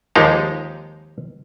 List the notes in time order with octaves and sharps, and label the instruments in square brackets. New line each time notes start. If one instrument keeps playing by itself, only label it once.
[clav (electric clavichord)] D#2 F3 G#3 D#4 G4